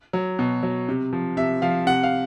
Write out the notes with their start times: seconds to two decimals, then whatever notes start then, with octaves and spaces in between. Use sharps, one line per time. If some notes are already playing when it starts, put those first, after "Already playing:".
0.13 F#3
0.39 B2
0.63 F#3
0.88 C3
1.13 F3
1.37 C3 E5
1.62 F3 F5
1.87 C3 F#5
2.03 F5